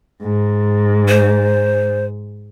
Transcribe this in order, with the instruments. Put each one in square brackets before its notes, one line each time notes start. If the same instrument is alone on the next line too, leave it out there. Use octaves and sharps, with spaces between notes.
[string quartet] G#2
[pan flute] C5